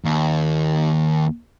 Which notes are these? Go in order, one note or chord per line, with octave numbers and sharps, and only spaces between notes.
D#2